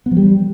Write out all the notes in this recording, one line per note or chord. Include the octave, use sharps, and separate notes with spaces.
B3
F3
G3